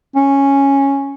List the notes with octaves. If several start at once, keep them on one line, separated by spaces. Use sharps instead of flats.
C#4